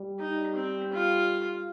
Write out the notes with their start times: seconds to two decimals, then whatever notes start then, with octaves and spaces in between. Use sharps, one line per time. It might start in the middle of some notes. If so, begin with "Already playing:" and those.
Already playing: G3
0.19 D#4
0.56 C4
0.93 F4